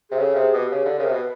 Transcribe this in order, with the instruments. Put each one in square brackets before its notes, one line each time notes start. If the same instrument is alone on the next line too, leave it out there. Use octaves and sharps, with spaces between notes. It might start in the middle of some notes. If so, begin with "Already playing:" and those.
[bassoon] C3 [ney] G#4
[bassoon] C#3 [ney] A4
[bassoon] C3 [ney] G#4
[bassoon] B2 [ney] G4
[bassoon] C#3 [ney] G4
[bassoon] D3
[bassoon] C#3 [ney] A#4
[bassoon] C3
[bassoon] B2 [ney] B4